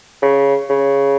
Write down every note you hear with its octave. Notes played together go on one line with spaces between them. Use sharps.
C#3
C#3